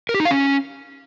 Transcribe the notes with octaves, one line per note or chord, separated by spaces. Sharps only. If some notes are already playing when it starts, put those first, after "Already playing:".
A#4
G4
D#4
F5
C#4